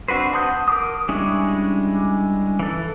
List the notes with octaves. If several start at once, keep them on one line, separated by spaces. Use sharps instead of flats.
C4 D4 F#4 B4 C5
F#5 A5 C6 D#6 G6
A#4 D6 D#6
G3 G#3 C#4 D4 E4
E3 A4